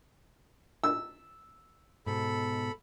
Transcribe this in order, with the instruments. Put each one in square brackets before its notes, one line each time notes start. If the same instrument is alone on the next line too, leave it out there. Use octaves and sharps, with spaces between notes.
[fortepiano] E6
[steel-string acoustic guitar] G#2 B2 [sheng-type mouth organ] A4 B5